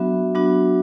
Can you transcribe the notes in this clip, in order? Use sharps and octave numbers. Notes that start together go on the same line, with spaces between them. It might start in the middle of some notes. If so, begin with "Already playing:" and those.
Already playing: F#3 B3 D4 F#4 E5
F#3 B3 D4 F#4